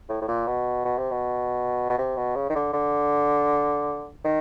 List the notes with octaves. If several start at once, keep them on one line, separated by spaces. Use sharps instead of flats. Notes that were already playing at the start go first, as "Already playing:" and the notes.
A2
A2
A#2
B2
B2
C3
B2
B2
C3
B2
C#3
D#3
D3
D3
D#3